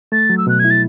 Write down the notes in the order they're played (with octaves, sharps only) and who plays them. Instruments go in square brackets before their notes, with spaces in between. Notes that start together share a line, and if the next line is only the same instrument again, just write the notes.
[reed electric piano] A3 [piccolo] A6
[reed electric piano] F#3
[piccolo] E6
[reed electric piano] B2 [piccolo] F#6
[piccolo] G#6
[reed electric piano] E4
[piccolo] A6